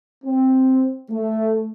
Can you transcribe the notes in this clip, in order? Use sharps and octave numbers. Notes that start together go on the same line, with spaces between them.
C4
A3